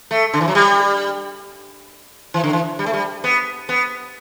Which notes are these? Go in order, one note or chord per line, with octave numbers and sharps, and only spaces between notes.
A3
D3
E3
F#3
G3
E3
D3
E3
G3
A3
G3
B3
B3